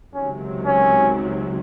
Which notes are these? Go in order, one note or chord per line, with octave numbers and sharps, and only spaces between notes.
C#2 C3 D#3 F#3 C#4
C#4